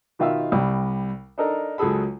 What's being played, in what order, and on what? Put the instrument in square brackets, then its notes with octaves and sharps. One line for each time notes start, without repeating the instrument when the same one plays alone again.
[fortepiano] B2 D#3 F4 E5 F5 E6
C2 G3
D4 D#4 A4 A#4
C#2 F#3 G#4 A4 B5